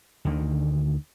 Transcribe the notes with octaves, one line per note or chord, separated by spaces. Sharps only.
D2 D3 D#3